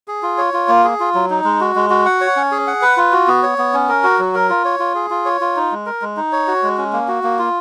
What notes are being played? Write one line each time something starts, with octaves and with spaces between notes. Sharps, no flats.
G#4
F4
C#5
F4
A#3
G#4
F4
F#3
D#4
G#3
F#4
G#3
F#4
F#5
C#5
C#4
G#4
F#5
B4
F4
F#4
B3
C#5
B3
C#4
A#4
F#4
F#3
A#4
F4
C#5
F4
G#4
F4
C#5
F4
D#4
G#3
A#4
G#3
D#4
C#5
F#4
G#3
C#4
A#3
F#4
A#3
F4